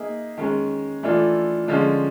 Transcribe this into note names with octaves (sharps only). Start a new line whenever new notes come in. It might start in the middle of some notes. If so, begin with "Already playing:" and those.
Already playing: A#3 D#4 G#4 E5
D#3 G#3 C#4
E3 A3 D4 F4
D3 F3 G#3 C#4 F4